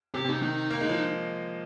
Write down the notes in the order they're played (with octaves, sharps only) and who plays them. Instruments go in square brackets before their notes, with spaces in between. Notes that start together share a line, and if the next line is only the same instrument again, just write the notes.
[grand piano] C3 [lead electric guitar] G4
[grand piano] C3
[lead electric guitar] D#4
[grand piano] D#3 [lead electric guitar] D#4
[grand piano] A#3
G#3
F3